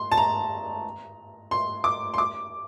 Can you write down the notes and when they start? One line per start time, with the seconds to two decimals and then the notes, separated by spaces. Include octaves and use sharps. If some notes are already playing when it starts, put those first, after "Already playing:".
Already playing: C6
0.12 A5
0.17 A#5
1.51 C6
1.84 D6
2.14 C6
2.18 D6